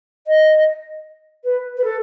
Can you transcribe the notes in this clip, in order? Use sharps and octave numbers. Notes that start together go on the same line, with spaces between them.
D#5
B4
B4
A4